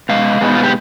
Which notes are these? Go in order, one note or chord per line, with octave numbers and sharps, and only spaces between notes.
B2 G#3 F5
B2 G#3 B3 D#4
F4
G4